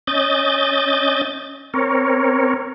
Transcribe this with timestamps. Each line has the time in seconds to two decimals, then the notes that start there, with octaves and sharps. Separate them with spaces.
0.07 C#4 D#5 G6 A6
1.74 C4 A#4 C#5